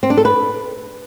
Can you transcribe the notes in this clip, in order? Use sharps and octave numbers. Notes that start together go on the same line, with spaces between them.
C4
D4
A4
B4